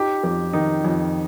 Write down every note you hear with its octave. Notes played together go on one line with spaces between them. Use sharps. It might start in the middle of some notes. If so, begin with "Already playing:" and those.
Already playing: D#4 G4
F2 G4
D#3 D#4
F2